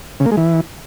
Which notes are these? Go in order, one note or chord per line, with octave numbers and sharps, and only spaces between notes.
C#3
A#3
G#3
E3